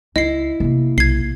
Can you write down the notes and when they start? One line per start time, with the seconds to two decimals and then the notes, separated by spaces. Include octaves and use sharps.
0.16 C#2 E4 D#5 C7
0.60 C3 A#3
0.98 B1 G#6 C7